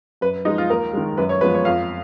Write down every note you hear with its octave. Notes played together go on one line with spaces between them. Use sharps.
F#2 B4
F3 G#3 D#4
F4
D#2 A#4
D#3 G#3
F#2 B4
C#5
F3 G#3 B3 B4
C#5
F2 F5